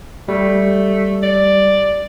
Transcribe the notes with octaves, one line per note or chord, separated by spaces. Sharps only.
G3 A3
D5